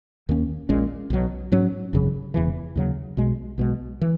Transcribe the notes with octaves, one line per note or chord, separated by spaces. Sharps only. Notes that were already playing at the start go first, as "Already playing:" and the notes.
D#2 D#3 A#3 C#4
A#1 A#2 G#3 C#4
B1 B2 F#3
G#2 F#3 C#4
G#1 F#2 C#3 F#3
E1 E2 C#3 E3
D#2 C#3 F#3
B1 B2 G#3
B1 B2 G#3
E3